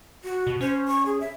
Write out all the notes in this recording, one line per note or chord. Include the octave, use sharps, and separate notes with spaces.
F#4
B2
C#4 C5
C#6
G#4
E5